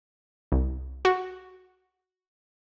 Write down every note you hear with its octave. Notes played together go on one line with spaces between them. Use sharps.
C2
F#4